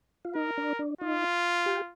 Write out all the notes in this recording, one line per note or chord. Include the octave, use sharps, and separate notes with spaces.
F4
D#4 A#4
D4
D4
D#4 F4
G4